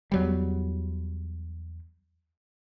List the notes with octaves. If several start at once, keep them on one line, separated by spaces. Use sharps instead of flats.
E2 F#3 G3